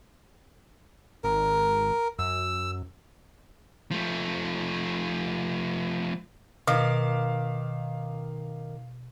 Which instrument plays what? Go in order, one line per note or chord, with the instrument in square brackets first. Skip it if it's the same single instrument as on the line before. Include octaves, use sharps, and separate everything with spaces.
[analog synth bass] G#1 [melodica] A#4
[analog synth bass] F#2 [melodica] E6
[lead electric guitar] F3 A3
[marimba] B2 [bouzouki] D#3 [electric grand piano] F5 D6 F6